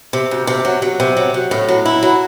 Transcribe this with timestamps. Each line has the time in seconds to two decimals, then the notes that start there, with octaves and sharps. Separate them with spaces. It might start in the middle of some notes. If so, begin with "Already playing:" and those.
0.13 C3
0.31 D2
0.47 C3
0.65 F#3
0.82 F#3
1.00 C3
1.17 F#3
1.34 F#3
1.51 A2
1.68 F#3
1.85 E4
2.03 F#3